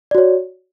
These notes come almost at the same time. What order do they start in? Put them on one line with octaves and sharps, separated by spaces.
D5 F#4 C#5